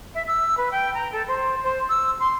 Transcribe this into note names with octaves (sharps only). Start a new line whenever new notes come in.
E5
E6
B4
G5
A#5
A4
C5
C5
E6
C6